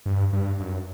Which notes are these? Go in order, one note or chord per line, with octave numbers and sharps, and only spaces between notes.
G2
G2
F#2